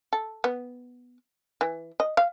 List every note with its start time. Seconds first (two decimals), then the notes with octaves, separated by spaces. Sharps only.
0.13 A4
0.44 B3
1.61 E3
2.00 D#5
2.17 F5